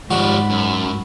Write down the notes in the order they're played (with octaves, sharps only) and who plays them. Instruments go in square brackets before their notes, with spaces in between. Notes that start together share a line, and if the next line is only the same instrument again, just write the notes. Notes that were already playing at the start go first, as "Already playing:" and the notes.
[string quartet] G#2 B5 [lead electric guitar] F3 G3 [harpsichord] F#4
[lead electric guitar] F#2